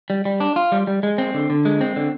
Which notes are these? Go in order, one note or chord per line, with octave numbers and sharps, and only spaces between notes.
G3
G3
D4
F4
G3
G3
G#3
C4
D3
D3
G#3
C4
D3